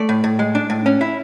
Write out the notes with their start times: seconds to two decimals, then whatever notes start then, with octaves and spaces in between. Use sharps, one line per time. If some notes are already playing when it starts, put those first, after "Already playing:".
Already playing: A3 D5
0.09 A2
0.24 A2
0.39 G#3
0.55 D4
0.70 A2
0.86 C#4
1.01 E4